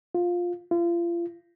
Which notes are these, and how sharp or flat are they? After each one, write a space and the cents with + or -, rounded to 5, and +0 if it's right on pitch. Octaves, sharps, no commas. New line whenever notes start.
F4 +10
F4 -35